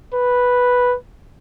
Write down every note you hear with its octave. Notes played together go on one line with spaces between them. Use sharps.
B4